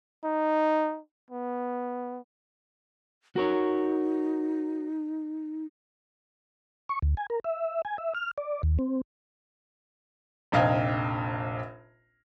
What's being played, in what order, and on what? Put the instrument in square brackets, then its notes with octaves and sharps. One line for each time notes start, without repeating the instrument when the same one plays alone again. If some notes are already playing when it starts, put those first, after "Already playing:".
[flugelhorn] D#4
B3
[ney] D#4 [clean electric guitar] F#4 A#4 C#5
[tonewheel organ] C#6
D2
G#5
A#4
E5
G#5
E5
F6
D5
D#2
C4
[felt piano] F1 A#1 D#5 F5 G5 G#6